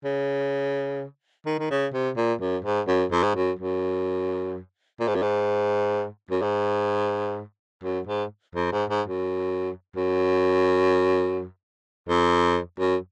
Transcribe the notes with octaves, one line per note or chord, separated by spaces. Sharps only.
C#3
D#3
D#3
C#3
C3
A#2
F#2
G#2
F#2
F2
G#2
F#2
F#2
A#2
G#2
F#2
G#2
F#2
G#2
F#2
G#2
F2
G#2
G#2
F#2
F#2
F2
F#2